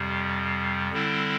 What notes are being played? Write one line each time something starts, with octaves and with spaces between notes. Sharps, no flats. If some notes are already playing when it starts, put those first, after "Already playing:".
Already playing: F2 C3 G3
D3 G3 C4 E4